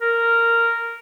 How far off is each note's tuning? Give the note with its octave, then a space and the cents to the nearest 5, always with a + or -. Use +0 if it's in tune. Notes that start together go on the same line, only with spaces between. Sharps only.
A#4 -10